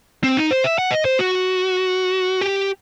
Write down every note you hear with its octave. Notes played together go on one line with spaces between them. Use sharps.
C4
D#4
C5
E5
F#5
D#5
C5
F#4
G4